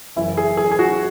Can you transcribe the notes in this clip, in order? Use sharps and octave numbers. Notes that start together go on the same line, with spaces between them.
F#1 F#2 E3 E4
G#4
G#4
G#4
F#4